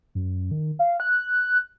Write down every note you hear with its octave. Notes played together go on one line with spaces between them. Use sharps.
F#2
D#3
F5
F#6